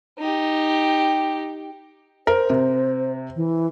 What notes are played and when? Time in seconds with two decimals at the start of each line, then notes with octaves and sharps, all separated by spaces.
0.19 D#4 G4
2.27 A#4 C5
2.50 C3
3.36 E3